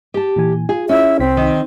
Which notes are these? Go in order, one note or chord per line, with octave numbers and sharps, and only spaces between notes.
G4 A5
A#2 E3 G#5
F4 G#4
C#4 E4 E5
C2 C4 B6
D#3